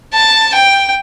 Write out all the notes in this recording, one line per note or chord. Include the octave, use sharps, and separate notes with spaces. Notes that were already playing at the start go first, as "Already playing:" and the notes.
A5
G5